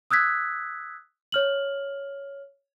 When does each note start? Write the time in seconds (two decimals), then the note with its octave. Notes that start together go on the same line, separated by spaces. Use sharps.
0.11 D#6 E6 F#6 G#6 B6
1.32 C#5 F6 F#7